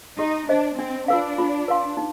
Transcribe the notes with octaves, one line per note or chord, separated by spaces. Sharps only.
D#4 G4
D4 C5 D#5
C4 D4
D4 F4 B4 F5
F4
B4 F5 C6
D#4